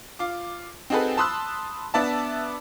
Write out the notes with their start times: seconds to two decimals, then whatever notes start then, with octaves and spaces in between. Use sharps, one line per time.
0.19 F4 D6
0.90 C4 D#4 F#4 G#4 A4 B4
1.17 A5 B5 C6 D#6 E6 F#6
1.94 B3 D4 D5 E5 A5